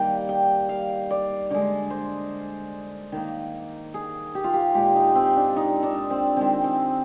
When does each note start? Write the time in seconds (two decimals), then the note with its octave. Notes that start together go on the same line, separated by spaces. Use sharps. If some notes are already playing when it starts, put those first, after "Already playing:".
Already playing: D#3 G3 A#3 G5
0.29 G5
0.69 F5
1.11 D5
1.51 D3 G#3 D5
1.90 C5
3.12 D#3 A#3
3.94 G#4
4.35 G4
4.44 F4
4.54 G4
4.74 A#2 G#3 G4
4.95 D#4
5.15 C4
5.36 D4
5.56 D#4
5.83 D4
6.10 C4
6.37 D#3 G#3 C4
6.64 C4